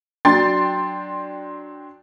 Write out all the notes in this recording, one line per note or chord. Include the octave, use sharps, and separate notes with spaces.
F#3 D4 G5 C6 A6